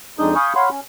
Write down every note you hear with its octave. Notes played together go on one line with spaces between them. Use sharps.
F2 G#3 D4 D#4 D#6 G6
F5 G#5 B5 C#6 D#6 G6
C#5 F5 F#5 B5 C6
C#4